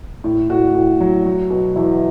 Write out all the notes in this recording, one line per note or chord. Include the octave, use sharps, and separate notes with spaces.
A2
A2 F#4
A2
F#3
F#3
B2
E2 E4